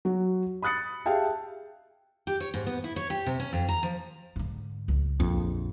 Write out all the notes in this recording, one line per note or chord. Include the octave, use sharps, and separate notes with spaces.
F#3 F#4
B5 D#6 F#6 A6 C#7
G4 G#4 E5 F5 G5 A5
G4
C#5
G#2
B3
E4
C#5
G4
C3
C#4
F2
A#5
F3
G#2 D3
C#2
A#1 F2 E3